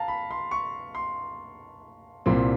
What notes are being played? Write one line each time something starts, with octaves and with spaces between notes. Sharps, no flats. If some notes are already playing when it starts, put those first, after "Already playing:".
Already playing: F5 A5 A#5
B5
C6
C#6
C6
C2 A#2 G3 C4